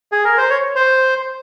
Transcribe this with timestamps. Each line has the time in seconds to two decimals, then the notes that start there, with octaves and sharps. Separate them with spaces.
0.12 G#4
0.25 A#4
0.37 C5
0.50 C#5
0.76 C5